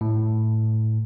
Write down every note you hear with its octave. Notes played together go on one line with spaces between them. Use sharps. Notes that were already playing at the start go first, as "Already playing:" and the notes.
A2